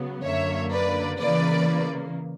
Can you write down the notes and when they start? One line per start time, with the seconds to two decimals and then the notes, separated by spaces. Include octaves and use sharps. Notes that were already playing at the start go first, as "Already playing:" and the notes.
Already playing: C#3 F#3 B3
0.25 F#2 D3 A#3 C#5 E5
0.72 B4 D5
1.18 C#3 E3 A#3 B4 D5